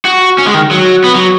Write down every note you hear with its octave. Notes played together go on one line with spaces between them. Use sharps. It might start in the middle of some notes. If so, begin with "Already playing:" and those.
F#4
C#4
G#3
D#3
F#3
B3
F#3